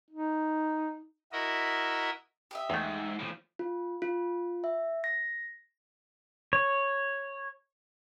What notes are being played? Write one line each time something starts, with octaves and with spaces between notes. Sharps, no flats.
D#4
E4 F#4 A#4 D#5 E5
G4 D#5 E5
E2 G#2 A3
A2 F3
F4
F4
E5
A#6
C#5